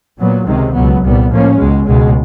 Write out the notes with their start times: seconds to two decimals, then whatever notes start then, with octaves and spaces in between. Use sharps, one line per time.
0.18 A#2 F#3 B3
0.46 C#2 C3 D#3 G#3
0.74 C#2 B2 F#3 B3
1.02 C2 A#2 G3 B3
1.30 A2 F3 A#3 C#4
1.58 C#2 B2 G#3
1.87 C#2 B2 G#3